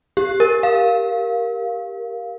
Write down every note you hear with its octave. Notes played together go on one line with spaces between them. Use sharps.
G4
A#4
F5